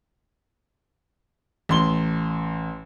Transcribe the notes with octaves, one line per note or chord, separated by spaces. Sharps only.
A1 C6 G7